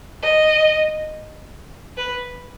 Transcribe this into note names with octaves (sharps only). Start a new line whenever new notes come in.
D#5
B4